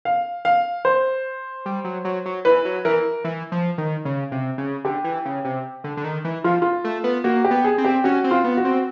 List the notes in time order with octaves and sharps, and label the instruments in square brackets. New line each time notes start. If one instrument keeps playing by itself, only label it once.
[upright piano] F5
F5
C5
[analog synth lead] G3
F#3
F#3
F#3
[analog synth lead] E3 [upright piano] B4
[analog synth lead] F#3
[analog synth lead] E3 [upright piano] A#4
[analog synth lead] E3
F3
D#3
C#3
C3
C#3
[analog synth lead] D3 [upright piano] G4
[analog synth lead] E3
C#3
C3
D3
D3
D#3
E3
[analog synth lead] F3 [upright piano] F4
[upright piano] F4
[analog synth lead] A3
B3
[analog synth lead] A#3 [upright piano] F#4
[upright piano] G4
[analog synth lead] B3
[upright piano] G#4
[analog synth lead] C4
[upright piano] G4
[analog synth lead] C#4 [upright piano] F#4
[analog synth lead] C4
[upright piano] F4
[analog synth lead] B3
[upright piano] F#4
[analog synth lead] C4